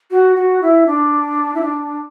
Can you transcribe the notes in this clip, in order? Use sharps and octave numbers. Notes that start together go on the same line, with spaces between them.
F#4
F#4
E4
D4
E4
D4